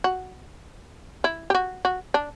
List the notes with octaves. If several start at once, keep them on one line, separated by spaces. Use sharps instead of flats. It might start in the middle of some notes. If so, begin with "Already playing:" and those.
F#4
E4
G4
F#4
F#4
D4